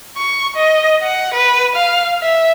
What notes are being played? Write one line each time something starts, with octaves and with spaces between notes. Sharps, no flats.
C#6
D#5
F#5
B4
F5
E5